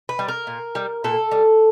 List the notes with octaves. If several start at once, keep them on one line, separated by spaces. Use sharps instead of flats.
B4
G3
A#4
A#2
G3
A#2 A4
G3